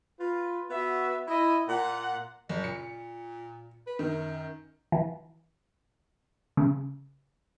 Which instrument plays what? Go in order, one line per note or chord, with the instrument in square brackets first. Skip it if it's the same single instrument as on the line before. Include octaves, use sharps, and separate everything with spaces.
[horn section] F4 B4
B3 F#4 E5
E4 D#5
A#2 F#5
[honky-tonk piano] F#1 [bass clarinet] B2
[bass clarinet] A#2 [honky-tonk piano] C#7
[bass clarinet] B4
[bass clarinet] F#2 [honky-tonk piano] D#3
[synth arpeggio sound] E3
C#3